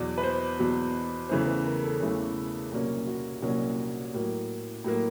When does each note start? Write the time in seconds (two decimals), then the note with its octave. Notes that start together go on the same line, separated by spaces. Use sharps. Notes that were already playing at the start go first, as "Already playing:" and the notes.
Already playing: E2 B2 F#3 D5
0.18 B4
0.24 C5
0.59 E2 B2 F#3
1.29 E2 C#3 E3 A3 C#4 C5
1.47 B4
1.66 A#4
1.84 A4
2.00 E2 C#3 E3 A3 C#4
2.72 C2 A#2 F#3 A#3 C#4
3.07 F#4
3.42 C2 A#2 F#3 A#3 C#4 F#4
4.14 A2 F#3 A#3
4.84 A2 F#3 A#3